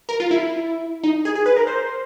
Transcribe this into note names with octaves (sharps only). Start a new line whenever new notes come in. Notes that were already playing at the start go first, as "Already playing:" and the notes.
A#4
F4
E4
D#4
G#4
G#4
B4
A#4
C5